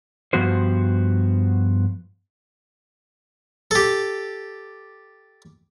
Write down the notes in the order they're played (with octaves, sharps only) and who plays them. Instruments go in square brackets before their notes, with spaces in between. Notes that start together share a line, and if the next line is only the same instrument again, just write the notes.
[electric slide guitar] G2 F3 B3 F#4 C5
[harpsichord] G4 A4